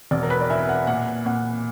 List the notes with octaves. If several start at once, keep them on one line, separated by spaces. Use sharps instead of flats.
E1 D5
A#4
B4
D5
E3 E5
F#5
A#2 F#5
A#2 F#5